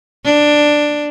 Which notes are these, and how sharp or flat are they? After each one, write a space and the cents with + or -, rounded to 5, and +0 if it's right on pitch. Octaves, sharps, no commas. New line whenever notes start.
D4 +5